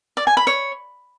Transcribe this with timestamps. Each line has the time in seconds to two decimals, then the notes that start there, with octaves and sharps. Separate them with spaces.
0.17 D5
0.27 G#5
0.37 B5
0.47 C#5